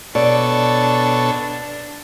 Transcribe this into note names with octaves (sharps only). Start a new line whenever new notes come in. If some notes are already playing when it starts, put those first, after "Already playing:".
B2 D4 A4 C#5 D5